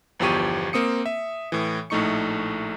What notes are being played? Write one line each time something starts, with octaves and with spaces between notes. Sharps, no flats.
G1 E2 F3 G4 C#6 D#7
A#3 C4 D#6 C#7
E5
A2 E3
A#1 A2 A3 D#4 C#6 C#7